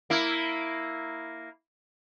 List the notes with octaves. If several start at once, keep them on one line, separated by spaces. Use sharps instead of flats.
A#3 E4